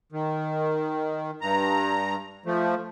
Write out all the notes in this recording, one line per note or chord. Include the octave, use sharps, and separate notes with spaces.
D#3
G2 A#5
F3 A3